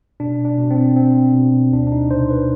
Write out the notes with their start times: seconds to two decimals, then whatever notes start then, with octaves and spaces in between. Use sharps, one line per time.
0.20 B2 D4
0.45 D4
0.58 B2
0.71 C4
0.96 C4
1.34 B2
1.72 D2 D4
1.87 D4
1.92 D#4
2.11 C3 C5
2.30 B4